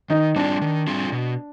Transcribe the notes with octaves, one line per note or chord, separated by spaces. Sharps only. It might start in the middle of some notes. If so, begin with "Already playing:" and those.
D#3 D#4
G3 C4 D4 F4
D#3
G3 C4 F4
B2